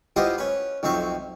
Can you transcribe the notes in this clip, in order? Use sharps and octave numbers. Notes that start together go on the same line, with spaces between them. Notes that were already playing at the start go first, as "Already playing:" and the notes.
B3 E4 F4 G4 C5 D#5
C#4 B4
B1 F2 C4 E5 C#6